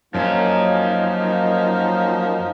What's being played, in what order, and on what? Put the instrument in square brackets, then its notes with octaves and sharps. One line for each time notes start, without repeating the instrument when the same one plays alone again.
[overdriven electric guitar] F#2 C#4 [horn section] F3 F#3 D#4 [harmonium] A#3